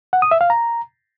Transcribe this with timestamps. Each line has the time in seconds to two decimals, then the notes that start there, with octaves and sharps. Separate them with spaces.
0.13 F#5
0.22 D#6
0.31 E5
0.41 F5
0.50 A#5